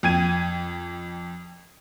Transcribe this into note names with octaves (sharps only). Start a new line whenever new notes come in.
F2 G5 G#6 D#7